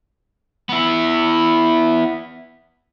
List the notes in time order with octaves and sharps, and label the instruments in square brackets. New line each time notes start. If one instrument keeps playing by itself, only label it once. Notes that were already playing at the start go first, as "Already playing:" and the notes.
[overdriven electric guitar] B3 E4